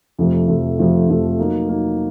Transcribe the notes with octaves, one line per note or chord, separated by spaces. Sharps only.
F2 C3 F3 A3
F2 C3 F3 A3
F2 C3 F3 A3
F2 C3 F3 A3
F#3 A#3 D#4
F#3 A#3 D#4